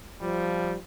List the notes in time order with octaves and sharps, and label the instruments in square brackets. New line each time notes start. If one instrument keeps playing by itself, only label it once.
[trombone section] F3 G3